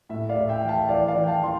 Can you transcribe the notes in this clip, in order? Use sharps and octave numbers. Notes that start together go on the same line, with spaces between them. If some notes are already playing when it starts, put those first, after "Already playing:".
A2 E5
D5 F5
A2
E5 G5
E3 G5
F5 A5
E3 D5 F5
D5 F5
E3
G5
F5 A5
E3 C6